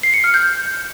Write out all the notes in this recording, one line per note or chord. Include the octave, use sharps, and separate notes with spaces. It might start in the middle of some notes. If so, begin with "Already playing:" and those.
C7
C#7
F6
G6